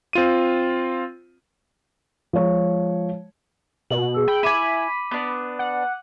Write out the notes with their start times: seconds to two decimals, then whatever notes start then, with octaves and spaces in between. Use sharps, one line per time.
0.13 C4 F4 D#7
2.33 F3 G#3 C#5
3.90 B2 F#7
4.14 G#4 E6
4.28 G5 B5
4.43 E4 G#5 B5 D6 D#7
5.11 B3 D4
5.59 F#5